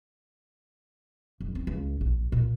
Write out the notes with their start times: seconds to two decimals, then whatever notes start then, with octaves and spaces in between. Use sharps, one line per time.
1.40 F#1
1.55 C4
1.67 C#2
2.01 A#1
2.32 A#2